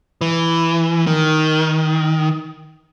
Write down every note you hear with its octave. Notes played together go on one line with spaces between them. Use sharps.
E3
D#3